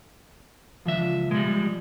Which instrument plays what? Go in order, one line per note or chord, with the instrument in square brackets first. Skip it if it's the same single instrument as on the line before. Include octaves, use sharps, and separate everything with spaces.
[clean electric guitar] C#2 E5 [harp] F3 D4
[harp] B2 [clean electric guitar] G3 G#3